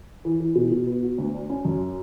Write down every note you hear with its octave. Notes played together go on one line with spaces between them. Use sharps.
E3
E3
B2
B2
B3
F#4
D2
D4
C#4
F#2